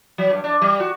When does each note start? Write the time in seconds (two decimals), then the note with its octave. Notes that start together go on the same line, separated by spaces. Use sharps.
0.18 F#3
0.30 G2
0.44 D4
0.61 G3
0.80 F#4